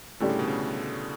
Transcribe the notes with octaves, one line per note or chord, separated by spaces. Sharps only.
A2 D3 G3 C#4 G4 D5
C#3
B2
C#3